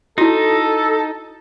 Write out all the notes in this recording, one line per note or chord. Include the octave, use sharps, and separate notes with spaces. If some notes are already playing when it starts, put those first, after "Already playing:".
D#4 E4 F#4 A4